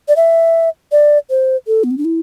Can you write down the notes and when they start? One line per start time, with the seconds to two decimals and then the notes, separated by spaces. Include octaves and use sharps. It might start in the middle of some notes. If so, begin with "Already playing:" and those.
0.08 D5
0.16 E5
0.92 D5
1.30 C5
1.67 A4
1.84 B3
1.91 C4
1.98 D4
2.05 E4